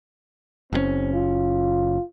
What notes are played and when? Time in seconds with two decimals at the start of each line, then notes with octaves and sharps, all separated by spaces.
0.73 F#1 A#2 C4 C#4
1.13 F4